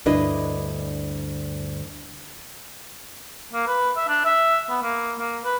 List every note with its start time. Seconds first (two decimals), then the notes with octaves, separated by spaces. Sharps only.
0.06 D2 G2 D4 E4 B4 D#5
3.53 A#3
3.67 B4
3.97 E5
4.08 D4
4.25 E5
4.69 B3
4.82 A#3
5.19 A#3
5.44 B4